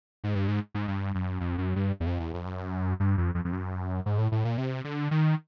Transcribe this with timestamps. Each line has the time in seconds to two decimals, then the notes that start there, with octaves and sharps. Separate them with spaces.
0.24 G#2
0.35 G2
0.48 G#2
0.75 G#2
0.88 G2
1.15 F#2
1.40 F2
1.58 F#2
1.76 G2
2.00 E2
2.07 F2
2.20 E2
2.34 F2
2.46 F#2
3.00 G2
3.18 F2
3.35 F2
3.45 F2
3.52 F#2
4.06 G#2
4.18 A2
4.32 A2
4.45 A#2
4.58 C3
4.85 D3
5.11 D#3